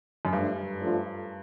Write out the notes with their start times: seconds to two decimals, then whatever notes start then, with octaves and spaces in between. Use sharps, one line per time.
0.25 F#2
0.33 G2 F3 A3 D4
0.79 F3 A3 D4 F4